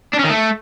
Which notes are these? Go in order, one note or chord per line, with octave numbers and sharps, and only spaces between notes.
D4
C#4
D#3
A3